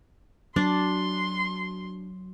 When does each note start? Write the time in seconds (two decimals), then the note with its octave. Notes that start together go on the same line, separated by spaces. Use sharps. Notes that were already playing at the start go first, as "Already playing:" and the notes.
0.56 F#3 D4 C6